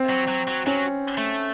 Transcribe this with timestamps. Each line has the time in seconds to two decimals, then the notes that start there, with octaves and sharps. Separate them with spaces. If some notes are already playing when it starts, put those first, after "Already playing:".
Already playing: C4
0.10 F#3
0.28 F#3
0.48 F#3
0.67 F#3 C#4
1.18 A3